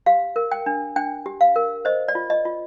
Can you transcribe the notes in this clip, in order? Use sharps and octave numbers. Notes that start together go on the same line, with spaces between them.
G4 F5
A#4
G5
D4
D4 G5
G4
F5
A#4
C5 D#5
D5
F4
D#5
F4